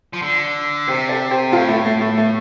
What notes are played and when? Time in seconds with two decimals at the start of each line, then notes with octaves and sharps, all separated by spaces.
0.13 F3
0.22 D3
0.88 C3 G4 C5
1.09 A4 D5
1.31 G4 C5
1.52 A2 F4 A4
1.69 A3
1.85 A3
2.01 A3
2.17 A3